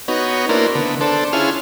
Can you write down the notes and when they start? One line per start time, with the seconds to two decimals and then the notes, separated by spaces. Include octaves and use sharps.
0.08 B3 D#4 F#4 C#5
0.49 A#3 D4 E4 A#4 C5
0.75 D3 B3
1.01 D4 A4 C5
1.33 C#4 E4 F4 G#4 F6